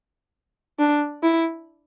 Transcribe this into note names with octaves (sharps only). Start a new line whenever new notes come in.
D4
E4